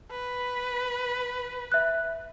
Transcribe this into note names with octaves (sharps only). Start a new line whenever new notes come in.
B4
E5 F#6